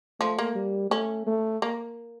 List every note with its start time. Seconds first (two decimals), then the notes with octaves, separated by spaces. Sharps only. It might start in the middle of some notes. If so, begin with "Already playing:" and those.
0.20 F3 A3
0.39 A#3
0.56 G3
0.91 A3 C#4
1.27 A3
1.62 A#3